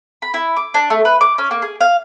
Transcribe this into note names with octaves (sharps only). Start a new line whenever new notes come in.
B5
E4
D6
D4
A3
B4
D6
C#4
A#3
G#4
F5